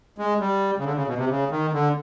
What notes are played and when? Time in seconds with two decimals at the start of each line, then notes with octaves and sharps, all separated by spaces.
0.18 G#3
0.40 G3
0.79 C#3
0.85 D3
0.96 C#3
1.07 B2
1.18 C3
1.29 C#3
1.51 D#3
1.73 D3